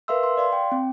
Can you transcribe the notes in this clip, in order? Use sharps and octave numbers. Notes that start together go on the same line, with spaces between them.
A#4 B4 E5 F5 C6 E6
C6
D5 F5 C6
G5
C4